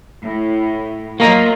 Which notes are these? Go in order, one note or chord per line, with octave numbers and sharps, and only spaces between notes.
A2
F#3 A#3 F4 D#5 A#5 C#6